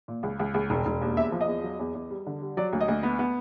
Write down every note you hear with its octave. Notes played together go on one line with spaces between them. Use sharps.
A#2
C#2
C#2
C#2
E1
E1
D#2
E2 E5
F3
D#5
E2
F#3
E2
E2
G3
D3
G3
F#3 D5
D2
D#5
D2
B3
B3